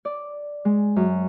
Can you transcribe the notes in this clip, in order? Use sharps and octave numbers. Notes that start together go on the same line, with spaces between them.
D5
G#3
F#2